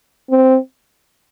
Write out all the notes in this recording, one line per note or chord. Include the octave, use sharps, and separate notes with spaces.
C4